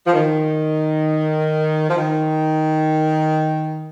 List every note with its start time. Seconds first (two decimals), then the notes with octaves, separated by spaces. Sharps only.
0.06 F3
0.13 D#3
1.88 F3
1.96 D#3